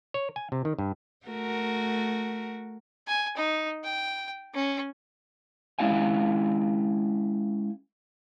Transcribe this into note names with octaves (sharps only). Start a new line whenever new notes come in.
C#5
G#5
C3
D#3
G2
A3 F#4 A#4
G#5
D#4
G5
C#4
G#3 C#4 E4 F5 G#5